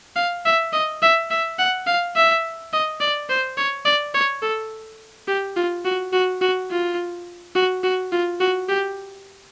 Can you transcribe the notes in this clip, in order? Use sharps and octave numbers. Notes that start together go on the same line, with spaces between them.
F5
E5
D#5
E5
E5
F#5
F5
E5
D#5
D5
C5
C#5
D5
C#5
A4
G4
F4
F#4
F#4
F#4
F4
F#4
F#4
F4
F#4
G4